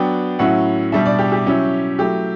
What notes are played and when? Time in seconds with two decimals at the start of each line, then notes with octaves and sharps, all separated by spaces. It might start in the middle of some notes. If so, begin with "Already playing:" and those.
Already playing: F#3 B3 D4 G5
0.39 A2 F#3 C#4 E4 F#5
0.92 B2 G3 D4 E5
1.05 D5
1.19 G4
1.32 G4
1.46 F#3 C#4 E4
1.98 F#3 A3 E4 G4